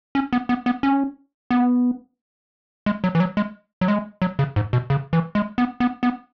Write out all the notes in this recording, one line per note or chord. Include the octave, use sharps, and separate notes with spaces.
C#4
B3
B3
B3
C#4
B3
G#3
F#3
E3
F#3
G#3
F#3
G#3
F#3
C#3
G#2
B2
C#3
E3
G#3
B3
B3
B3